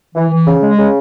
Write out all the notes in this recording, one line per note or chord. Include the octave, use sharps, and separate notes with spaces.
E3
E3
C#3
G#3
C#3